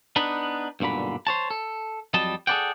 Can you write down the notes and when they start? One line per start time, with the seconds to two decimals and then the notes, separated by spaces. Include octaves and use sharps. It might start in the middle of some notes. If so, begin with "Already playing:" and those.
0.16 B3 D4 D#4 B4
0.80 B1 G2 A#2 D3 B5
1.27 C5 C#5 A5
1.50 A4
2.14 F2 F#3 G3 D#5 A5
2.47 G#4 A4 C5 D5 F#5 G5